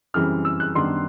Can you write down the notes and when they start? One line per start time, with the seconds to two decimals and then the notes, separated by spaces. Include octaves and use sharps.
0.14 F#2 C#3 E3 G3 C4 F6
0.45 E6
0.60 F#6
0.75 F#2 D#3 G3 B3 D4 C6